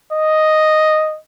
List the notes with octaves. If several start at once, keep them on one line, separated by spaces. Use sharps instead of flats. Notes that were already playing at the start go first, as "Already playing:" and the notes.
D#5